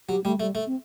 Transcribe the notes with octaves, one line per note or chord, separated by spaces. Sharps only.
F#3 G4
G3 A3
G3 A3
A3
C4